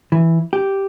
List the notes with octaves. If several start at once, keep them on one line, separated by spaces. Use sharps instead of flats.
E3
G4